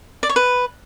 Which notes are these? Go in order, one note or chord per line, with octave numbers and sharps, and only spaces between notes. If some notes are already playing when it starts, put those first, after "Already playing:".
D5
C#5
B4